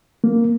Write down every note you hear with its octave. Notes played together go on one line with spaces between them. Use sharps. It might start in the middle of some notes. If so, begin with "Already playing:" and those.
A#3